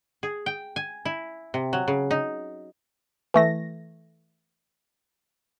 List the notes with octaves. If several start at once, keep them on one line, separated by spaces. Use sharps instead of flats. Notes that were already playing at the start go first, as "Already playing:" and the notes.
G#4
G5
G#5
E4
C3
F#3
C#3
D#4
E3 A3 A#6